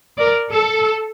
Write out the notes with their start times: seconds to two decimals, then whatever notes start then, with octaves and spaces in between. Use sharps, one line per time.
0.18 A#4 D5
0.53 A4